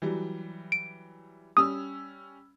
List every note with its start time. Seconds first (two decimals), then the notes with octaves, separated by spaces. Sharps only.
0.02 E3 F#3 G3
0.72 D7
1.57 G3 C#4 D#6 E6